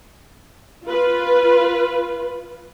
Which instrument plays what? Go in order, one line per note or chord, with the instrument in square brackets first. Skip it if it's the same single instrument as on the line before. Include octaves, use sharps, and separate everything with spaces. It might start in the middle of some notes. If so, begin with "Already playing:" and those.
[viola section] F4 B4